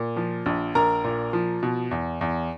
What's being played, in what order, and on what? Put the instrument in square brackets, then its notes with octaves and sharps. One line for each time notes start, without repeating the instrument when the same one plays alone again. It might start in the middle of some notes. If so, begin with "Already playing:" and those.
Already playing: [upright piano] A#2
F3
A#1
A#1 A#4 A#5
A#2
F3
B2
E2
E2